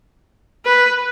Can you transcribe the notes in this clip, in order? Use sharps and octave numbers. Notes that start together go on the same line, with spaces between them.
B4